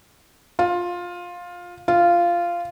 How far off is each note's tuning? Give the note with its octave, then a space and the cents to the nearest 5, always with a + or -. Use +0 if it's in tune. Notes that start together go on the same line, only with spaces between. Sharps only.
F4 +15
F4 -10